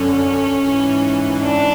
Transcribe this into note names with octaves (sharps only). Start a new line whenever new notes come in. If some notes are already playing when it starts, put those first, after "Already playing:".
Already playing: F#2 D3 C#4
G#2 E3
D4